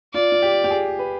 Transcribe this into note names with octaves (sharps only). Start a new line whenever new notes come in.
F4 D5
F4
G4
G4
G#4
B4